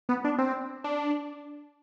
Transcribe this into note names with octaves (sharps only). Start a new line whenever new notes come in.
B3
D4
C4
D4